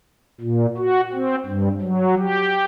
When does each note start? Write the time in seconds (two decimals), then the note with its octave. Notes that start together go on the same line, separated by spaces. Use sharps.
0.40 A#2
0.77 F#4
1.13 C4
1.46 G2
1.82 F#3
2.19 G4